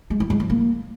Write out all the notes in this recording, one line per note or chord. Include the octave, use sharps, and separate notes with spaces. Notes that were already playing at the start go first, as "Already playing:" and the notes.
G#3
E4
G#3
F3
A#3